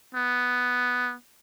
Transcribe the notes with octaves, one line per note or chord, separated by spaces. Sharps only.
B3